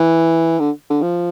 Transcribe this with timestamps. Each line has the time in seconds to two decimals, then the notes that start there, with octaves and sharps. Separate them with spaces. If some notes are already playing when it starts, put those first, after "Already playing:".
Already playing: E3
0.59 D3
0.90 D3
1.02 F3